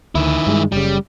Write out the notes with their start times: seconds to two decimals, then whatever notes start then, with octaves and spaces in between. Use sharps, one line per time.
0.15 D2 D#3 E4
0.47 G2 G3 G#3
0.72 F#1 C#3 G3